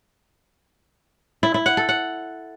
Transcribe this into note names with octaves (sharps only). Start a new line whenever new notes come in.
E4
E4
F#5
A4
F#5